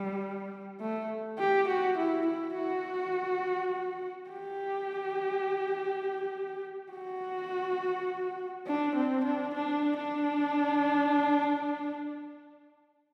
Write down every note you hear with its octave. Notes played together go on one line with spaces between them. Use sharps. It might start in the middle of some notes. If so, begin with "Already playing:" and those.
Already playing: G3
A3
G4
F#4
E4
E4
F#4
G4
F#4
D4
C4
D4
D4
D4